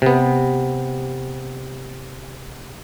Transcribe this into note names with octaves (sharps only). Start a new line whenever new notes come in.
C3 B3